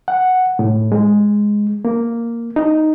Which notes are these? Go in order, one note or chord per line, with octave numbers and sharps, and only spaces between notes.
F#5
A2
G#3
A#3
D#4